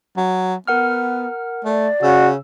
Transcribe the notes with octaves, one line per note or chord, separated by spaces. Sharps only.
F#3
B3 A#4 F#5 F6
A3 D5
C#3 F#4 E6